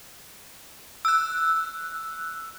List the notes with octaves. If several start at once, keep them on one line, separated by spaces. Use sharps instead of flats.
E6 F#6